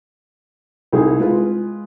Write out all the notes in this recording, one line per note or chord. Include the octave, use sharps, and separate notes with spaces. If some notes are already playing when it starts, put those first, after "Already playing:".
C2 D#4 G#4
G#3 F4 B4